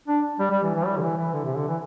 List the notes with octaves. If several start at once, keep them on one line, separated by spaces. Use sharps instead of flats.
D4
G3
G3
E3
E3
G3
D3
E3
E3
D3
C3
D3
E3